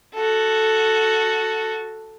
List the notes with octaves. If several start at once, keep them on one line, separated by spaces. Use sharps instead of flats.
F#4 A4